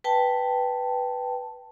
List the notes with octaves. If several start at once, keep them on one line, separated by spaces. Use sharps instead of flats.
B4 G5 A5